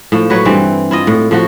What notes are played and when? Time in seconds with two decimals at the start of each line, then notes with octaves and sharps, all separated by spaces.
0.12 A2 F3
0.30 F#3 B4 C#5
0.45 G2 E3 C4
0.91 E4 F4 D#5
1.07 A2
1.31 A2 F3 F#4